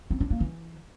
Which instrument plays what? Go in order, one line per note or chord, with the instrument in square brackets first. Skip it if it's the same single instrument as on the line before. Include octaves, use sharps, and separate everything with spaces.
[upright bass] C4
D4
A#3
E3